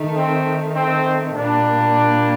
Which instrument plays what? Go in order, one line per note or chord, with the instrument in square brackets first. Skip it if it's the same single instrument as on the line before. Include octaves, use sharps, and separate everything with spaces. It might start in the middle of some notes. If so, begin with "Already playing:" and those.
Already playing: [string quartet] D#3 A3 D#4
[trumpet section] C4
C4
[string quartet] A#2 G3 A#3 [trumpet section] D4